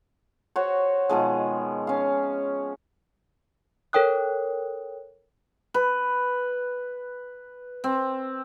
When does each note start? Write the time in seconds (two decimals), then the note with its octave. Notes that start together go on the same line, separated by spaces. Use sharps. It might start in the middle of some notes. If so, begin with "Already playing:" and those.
0.56 F#4 C5 C#5
1.09 B2 D#3 F3 G#3
1.87 C#4 F5
3.93 A4 A#4 C#5 G5 D#6 F#6
5.74 B4
7.84 C4